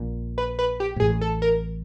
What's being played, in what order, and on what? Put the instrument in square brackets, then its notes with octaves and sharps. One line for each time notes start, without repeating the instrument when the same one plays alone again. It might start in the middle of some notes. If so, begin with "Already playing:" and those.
Already playing: [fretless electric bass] A#1 A#2
[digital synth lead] B4
B4
G4
[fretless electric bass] G#2
[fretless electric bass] A1 A2 [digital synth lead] G#4
[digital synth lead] A4
A#4